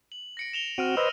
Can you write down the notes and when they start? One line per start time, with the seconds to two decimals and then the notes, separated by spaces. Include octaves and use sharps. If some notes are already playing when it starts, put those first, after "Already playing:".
0.12 F#7
0.37 A#6 C#7 D7
0.53 E7 F7 G7
0.78 C4 F#4 F6 D7 D#7
0.97 B4 C5 D#5 E6 A#6